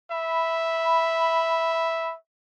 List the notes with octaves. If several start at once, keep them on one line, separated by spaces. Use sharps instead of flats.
E5 B5